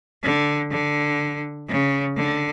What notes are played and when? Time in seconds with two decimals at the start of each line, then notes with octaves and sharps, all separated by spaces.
0.23 D3
0.71 D3
1.68 C#3
2.16 D3